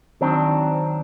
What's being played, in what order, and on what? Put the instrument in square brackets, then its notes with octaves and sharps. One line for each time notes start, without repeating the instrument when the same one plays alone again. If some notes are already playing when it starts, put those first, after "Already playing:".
[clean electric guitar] D#3 F#3 C4 D4